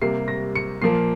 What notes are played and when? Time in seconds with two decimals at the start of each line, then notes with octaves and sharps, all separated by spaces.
0.02 C3 G3 A#3 C7
0.28 A#6
0.55 C#7
0.82 A#2 F3 A#3 C7